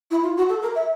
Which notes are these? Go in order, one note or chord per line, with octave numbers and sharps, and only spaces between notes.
E4
F4
F#4
A4
A#4
E5